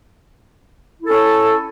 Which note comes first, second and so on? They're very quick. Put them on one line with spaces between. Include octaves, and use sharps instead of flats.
E4 A4 C#4